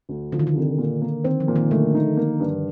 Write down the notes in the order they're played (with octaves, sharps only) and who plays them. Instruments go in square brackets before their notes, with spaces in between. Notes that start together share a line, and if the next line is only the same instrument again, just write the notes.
[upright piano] D2
[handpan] D3 [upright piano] F3
[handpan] D#3
D3
[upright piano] C2
A#2
A#3
[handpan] D#3 [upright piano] C4
[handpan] F3
[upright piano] A#2
[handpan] D#3
[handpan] D3 [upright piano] A3
[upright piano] D#4
A#3
G2